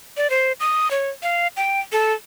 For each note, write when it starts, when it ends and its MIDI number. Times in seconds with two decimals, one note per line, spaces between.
0.17 0.30 74
0.30 0.52 72
0.60 0.90 87
0.91 1.10 73
1.23 1.47 77
1.57 1.80 79
1.92 2.13 69